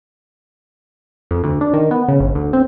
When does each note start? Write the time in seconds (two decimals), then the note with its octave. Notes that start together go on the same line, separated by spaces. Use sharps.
1.31 F2
1.44 D2
1.61 D4
1.74 D#3
1.91 B3
2.08 C#3
2.20 G1
2.35 D2
2.53 C4